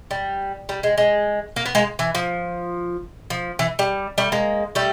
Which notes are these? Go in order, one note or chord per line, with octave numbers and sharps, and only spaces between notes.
G3
G3
G#3
G#3
A#3
B3
G#3 A#3
E3
F3
F3
E3
G3
G3 A3
G#3 A#3
G3 A3